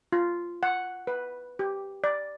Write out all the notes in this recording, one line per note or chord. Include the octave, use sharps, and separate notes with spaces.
F4
F#5
B4
G4
D5